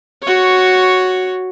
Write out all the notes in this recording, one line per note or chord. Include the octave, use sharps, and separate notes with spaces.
F#4 C#5